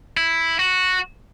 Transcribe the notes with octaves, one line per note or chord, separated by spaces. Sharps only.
E4
F#4